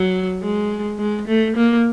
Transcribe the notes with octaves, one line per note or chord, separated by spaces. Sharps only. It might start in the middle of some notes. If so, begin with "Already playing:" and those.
Already playing: F#3
G#3
G#3
A3
A#3